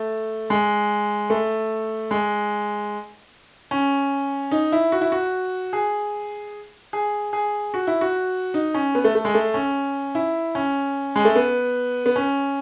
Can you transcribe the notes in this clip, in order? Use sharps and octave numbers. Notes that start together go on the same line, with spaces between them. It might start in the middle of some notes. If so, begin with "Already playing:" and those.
Already playing: A3
G#3
A3
G#3
C#4
D#4
E4
F#4
E4
F#4
G#4
G#4
G#4
F#4
E4
F#4
D#4
C#4
B3
A3
A3
G#3
A3
C#4
E4
C#4
G#3
A3
B3
B3
C#4